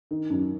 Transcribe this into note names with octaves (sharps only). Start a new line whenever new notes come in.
D#3
F#2